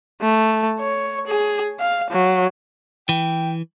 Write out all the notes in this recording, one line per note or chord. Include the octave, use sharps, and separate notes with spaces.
A3
C#5
G#4
F5
F#3
E3 G5